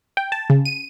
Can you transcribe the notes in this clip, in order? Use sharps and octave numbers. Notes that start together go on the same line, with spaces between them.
G5
A5
C#3
D#7